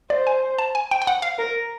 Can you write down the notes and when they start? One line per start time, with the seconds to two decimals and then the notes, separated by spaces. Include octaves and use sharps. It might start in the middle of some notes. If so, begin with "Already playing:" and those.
0.10 C5 D5
0.27 G#5
0.59 A5
0.75 G#5
0.91 G5
1.02 G5
1.07 F#5
1.22 F5
1.38 A#4